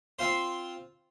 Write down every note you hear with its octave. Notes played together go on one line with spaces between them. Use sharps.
C4 F4 C5